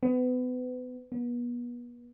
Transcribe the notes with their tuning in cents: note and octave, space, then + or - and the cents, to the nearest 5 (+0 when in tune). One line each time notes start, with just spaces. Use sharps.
B3 +30
B3 -35